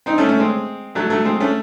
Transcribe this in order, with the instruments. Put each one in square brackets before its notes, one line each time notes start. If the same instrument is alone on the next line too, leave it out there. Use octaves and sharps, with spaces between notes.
[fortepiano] C4 D#4
A3 C#4
A3 C#4
G#3 C4
F#3 A3
F#3 A3
G#3 C4
A3 C#4